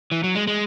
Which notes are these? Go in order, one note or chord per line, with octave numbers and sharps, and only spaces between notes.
E3
F#3
G#3
G#3